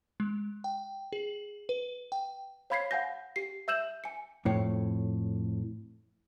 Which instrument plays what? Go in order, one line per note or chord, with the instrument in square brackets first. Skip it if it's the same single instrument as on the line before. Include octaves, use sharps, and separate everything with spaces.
[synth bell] G#3
G5
G#4
B4
G5
[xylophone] C#5 F5 B5 G#6 B6 C7
F5 F#5 G#5 G6 A#6
G4 C7
E5 E6 G6 E7 F#7
G#5 C#7
[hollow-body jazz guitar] F2 A2 C#5